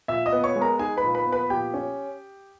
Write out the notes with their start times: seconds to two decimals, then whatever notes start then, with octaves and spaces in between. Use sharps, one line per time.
0.08 A#2 E5 E6
0.26 D#5 D#6
0.32 B3
0.44 C#5 C#6
0.56 G#3
0.61 A#4 A#5
0.79 D#4 G#4 G#5
0.97 B4 B5
1.03 A#2
1.15 B4 B5
1.26 B3
1.32 B4 B5
1.50 A#2 G4 G5
1.74 C#4